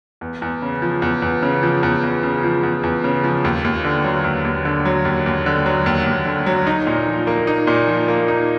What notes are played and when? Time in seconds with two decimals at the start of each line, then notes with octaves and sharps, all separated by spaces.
0.21 E2
0.42 E2
0.62 C#3
0.82 F3
1.02 E2
1.22 E2
1.42 C#3
1.63 F3
1.83 E2
2.03 E2
2.23 C#3
2.43 F3
2.63 E2
2.83 E2
3.04 C#3
3.24 F3
3.44 D#2
3.64 D#2
3.84 D3
4.04 F#3
4.24 D#2
4.45 D#2
4.65 D3
4.85 F#3
5.05 D#2
5.26 D#2
5.46 D3
5.66 F#3
5.86 D#2
6.06 D#2
6.26 D3
6.46 F#3
6.67 D#4
6.87 A#2
7.07 F3
7.27 A#3
7.47 D#4
7.67 A#2
7.87 F3
8.08 A#3
8.28 D#4